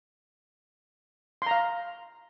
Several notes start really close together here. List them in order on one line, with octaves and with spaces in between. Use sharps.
C6 A#5 F5